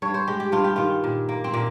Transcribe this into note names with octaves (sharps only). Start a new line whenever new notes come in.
G2 C#5
C5
G#3 G4
G4
G2 F4
G4
D#3 F4
A#2
A#3
C4
A#2 A#3